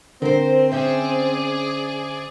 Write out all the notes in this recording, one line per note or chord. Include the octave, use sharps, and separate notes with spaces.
D3 C4 A#4 C5
C#4 G#4 C5 D5 E5